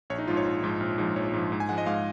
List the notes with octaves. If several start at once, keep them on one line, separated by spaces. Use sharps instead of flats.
A#1 C#5
D#4
G#2 F3 F4
C#5
A#1
G#2 F3
A#1
G#2 F3
A#1 C#5
G#2 F3
G#2
G#5
F3 G#3 F#5
D#5
G#2 F5